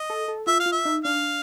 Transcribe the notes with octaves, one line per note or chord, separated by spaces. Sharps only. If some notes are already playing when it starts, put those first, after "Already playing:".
Already playing: D#5
A4
A4
F4 E5
F5
F4
E5
D#4
D4 F5